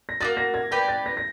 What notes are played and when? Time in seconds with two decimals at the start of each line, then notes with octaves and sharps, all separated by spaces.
0.09 A#6
0.21 A#3 D#4 F#4 A6
0.37 A#6
0.54 G#6
0.71 G4 B4 D5 G6
0.88 A6
1.06 A#6
1.17 A#6